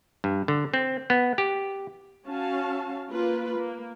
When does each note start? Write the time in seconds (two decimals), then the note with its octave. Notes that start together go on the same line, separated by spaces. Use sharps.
0.24 G2
0.48 D3
0.74 C4
1.10 B3
1.38 G4
2.27 C#4 F#4 F5 A5
3.11 A#3 F4 B4
3.54 A#3